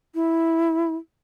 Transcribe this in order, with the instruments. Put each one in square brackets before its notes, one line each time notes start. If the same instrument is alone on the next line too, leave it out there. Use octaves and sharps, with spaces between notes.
[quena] E4